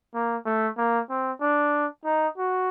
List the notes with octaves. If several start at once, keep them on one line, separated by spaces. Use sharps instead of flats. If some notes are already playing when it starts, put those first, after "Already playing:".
A#3
A3
A#3
C4
D4
D#4
F#4